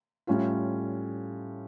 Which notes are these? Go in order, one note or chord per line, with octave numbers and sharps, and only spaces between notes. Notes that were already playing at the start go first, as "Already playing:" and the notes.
A2 G3 C#4 F4